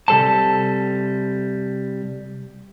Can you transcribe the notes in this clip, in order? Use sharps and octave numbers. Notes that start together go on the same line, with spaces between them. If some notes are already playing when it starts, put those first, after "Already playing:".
C3 G3 A4 C5 A5